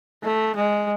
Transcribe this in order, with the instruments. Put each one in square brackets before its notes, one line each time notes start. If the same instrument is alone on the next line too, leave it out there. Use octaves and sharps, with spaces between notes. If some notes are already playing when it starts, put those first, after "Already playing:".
[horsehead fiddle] A3
G#3